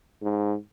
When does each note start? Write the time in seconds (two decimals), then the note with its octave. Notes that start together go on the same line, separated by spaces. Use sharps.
0.22 G#2